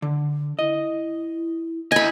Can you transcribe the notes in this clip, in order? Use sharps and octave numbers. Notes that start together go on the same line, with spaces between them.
D3
E4 D#5
E4 D#5 G#5 B5